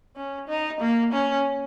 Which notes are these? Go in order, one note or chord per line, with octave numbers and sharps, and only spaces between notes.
C#4
D#4
A#3
C#4